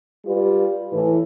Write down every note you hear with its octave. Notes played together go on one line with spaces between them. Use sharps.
G3 F4 G4 B4
A2 E3